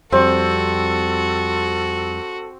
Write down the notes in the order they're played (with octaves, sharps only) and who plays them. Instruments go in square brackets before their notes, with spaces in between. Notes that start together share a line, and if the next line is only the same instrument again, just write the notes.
[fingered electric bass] F2 G3 [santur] C4 [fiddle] F#4 [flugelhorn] A4